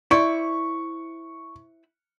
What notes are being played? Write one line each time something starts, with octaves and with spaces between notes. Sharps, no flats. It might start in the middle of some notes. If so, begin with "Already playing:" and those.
E4 C5 D5 C#6